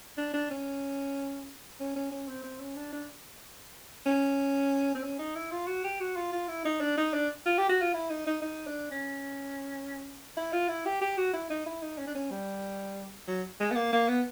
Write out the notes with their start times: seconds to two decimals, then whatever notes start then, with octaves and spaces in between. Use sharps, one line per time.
0.18 D4
0.34 D4
0.51 C#4
1.80 C#4
1.96 C#4
2.12 C#4
2.29 C4
2.44 C4
2.60 C#4
2.76 D4
2.93 D4
4.06 C#4
4.95 C4
5.03 C#4
5.19 D#4
5.36 E4
5.52 F4
5.67 F#4
5.84 G4
6.00 F#4
6.16 F4
6.32 F4
6.48 E4
6.65 D#4
6.81 D4
6.98 D#4
7.14 D4
7.46 F4
7.58 G4
7.69 F#4
7.82 F4
7.94 E4
8.10 D#4
8.27 D#4
8.42 D#4
8.67 D4
8.91 C#4
10.37 E4
10.53 F4
10.69 E4
10.86 G4
11.02 G4
11.18 F#4
11.33 E4
11.50 D#4
11.66 E4
11.82 D#4
11.98 C#4
12.07 D4
12.15 C#4
12.31 G3
13.28 F#3
13.60 G#3
13.71 B3
13.76 A#3
13.93 A#3
14.08 B3